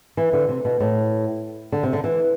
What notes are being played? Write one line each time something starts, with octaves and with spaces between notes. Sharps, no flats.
E3
D3
C3
B2
A2
D3
C3
D3
E3